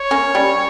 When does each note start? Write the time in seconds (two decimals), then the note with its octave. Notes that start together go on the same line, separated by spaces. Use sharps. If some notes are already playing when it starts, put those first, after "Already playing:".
Already playing: C#5
0.11 A#3 C#4
0.35 G3